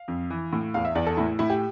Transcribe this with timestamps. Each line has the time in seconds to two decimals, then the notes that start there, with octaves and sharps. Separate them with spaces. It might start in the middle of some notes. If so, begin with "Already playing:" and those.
Already playing: F5
0.08 F2
0.30 E3
0.53 A2
0.74 E2 F5
0.85 E5
0.95 E2 D5
1.07 A4
1.17 A2 E4
1.39 A2 E4
1.50 G4